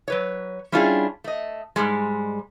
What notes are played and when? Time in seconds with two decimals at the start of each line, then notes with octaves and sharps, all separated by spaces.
0.08 F#3 B4 C#5
0.72 G3 C#4 D4 E4 F4 G#4
1.24 A3 D#5
1.76 G#2 C#3 G3 G#3